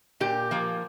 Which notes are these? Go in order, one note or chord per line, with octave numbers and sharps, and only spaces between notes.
A#2 G4
F3 A#3